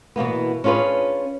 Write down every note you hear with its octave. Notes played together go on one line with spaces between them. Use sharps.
B2 E3 A#3 B3
C#4 D4 F4 G#4 B4